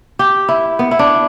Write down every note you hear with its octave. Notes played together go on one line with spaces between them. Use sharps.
G4
E4
B3
E4
D4